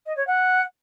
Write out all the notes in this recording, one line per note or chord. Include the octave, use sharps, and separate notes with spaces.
D#5
C#5
F#5